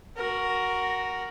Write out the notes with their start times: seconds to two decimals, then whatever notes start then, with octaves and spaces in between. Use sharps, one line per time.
0.16 F#4 A#4